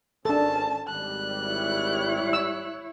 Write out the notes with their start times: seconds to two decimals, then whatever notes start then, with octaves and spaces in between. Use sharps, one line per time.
0.25 G#1 C#4 D4 A4 A5
0.88 G#1 G3 F#6
1.46 E4 C#5
2.33 E6